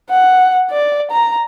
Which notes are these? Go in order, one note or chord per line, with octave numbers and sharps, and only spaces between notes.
F#5
D5
A#5